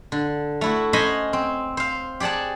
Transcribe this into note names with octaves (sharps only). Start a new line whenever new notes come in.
D3
A3 E4 F#4
C#4 C5 D#5 F#5 G#5 B5
C4
C5 F5
G4 G#4 D5 F#5 A5